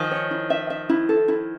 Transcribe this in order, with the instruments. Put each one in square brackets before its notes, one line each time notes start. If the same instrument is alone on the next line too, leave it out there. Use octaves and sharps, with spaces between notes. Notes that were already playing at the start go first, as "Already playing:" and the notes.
Already playing: [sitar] D#3 F3 [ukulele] G#5
[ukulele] C#5
E4
E5
E5
E4
A4
E4